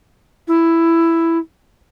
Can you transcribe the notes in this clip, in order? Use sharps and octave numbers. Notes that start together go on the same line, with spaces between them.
E4